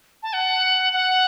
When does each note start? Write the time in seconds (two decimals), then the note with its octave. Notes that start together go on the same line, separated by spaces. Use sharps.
0.23 A5
0.33 F#5
0.93 F#5